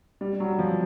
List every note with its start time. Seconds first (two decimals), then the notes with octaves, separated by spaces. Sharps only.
0.21 G3
0.40 F#3
0.59 F3